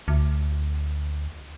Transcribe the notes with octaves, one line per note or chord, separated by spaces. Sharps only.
D2